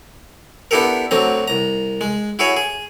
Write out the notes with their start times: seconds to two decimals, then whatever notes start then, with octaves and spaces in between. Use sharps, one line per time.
0.71 B3 D4 E4 G4 A4 A#4
1.11 D2 D3 F#3 C4 A#5
1.48 C2 A#5
2.01 G#3
2.39 E4 F#4 G#4 C#5
2.57 G#4